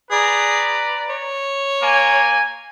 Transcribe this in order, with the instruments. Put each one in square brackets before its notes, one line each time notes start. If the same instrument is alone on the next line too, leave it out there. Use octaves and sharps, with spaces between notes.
[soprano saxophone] G#4 [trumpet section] B4 D5 A#5
[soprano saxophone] C#5
[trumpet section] A#3 G#5